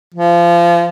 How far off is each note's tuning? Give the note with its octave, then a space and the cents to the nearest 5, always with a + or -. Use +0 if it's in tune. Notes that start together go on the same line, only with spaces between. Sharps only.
F3 -25